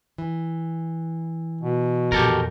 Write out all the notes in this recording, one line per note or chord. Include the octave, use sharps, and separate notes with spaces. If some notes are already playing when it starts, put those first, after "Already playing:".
E3
B2
F2 A#2 G4 A4 A#4